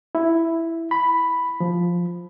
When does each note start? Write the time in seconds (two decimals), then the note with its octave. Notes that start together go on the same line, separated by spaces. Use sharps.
0.15 E4
0.91 B5
1.60 F3